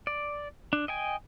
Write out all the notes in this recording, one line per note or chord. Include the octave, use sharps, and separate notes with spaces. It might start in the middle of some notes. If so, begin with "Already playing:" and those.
D5
D4
D#5 G5 G#5